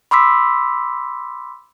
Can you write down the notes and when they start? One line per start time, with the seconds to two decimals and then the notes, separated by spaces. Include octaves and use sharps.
0.11 B5 C6 D6 E6 B6